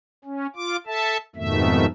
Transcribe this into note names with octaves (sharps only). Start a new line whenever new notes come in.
C#4
F4 D6
A4 E5 A5
F2 G#2 B2 D#3 A3 E5